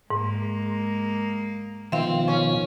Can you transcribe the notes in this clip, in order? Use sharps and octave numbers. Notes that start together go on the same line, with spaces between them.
G#2 G#3 A#3
B2 D#3 F3 C4 E5 F5
C#4